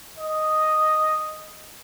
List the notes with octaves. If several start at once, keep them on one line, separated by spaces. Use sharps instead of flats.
D#5